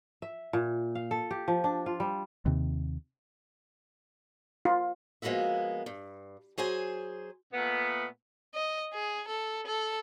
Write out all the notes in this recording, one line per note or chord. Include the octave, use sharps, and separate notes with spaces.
E5
A#2
F5
A4
G4
F3
D4
F4
G3
D#2 C3
F4
F3 G#3 A#3 B3 F#4 E5
G2
F#3 G#4 C5 G#5
A#2 A3 B3
D#5
G#4
A4
A4